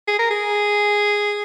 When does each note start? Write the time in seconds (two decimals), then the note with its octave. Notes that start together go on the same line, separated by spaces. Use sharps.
0.07 G#4
0.19 A#4
0.31 G#4